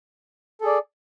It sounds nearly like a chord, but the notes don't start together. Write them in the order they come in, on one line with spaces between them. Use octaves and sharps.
A4 G#4 D5